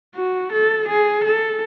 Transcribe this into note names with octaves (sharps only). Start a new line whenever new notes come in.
F#4
A4
G#4
A4